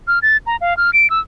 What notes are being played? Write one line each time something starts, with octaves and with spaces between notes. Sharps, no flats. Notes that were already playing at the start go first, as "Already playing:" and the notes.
F6
A6
A#5
F5
F6
D7
E6